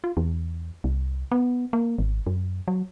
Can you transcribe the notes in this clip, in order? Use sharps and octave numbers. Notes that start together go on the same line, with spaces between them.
F4
E2
C2
B3
A#3
G#1
F#2
F#3